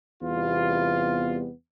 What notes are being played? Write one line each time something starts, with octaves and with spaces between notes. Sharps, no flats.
E2 C3 G3 B3 F4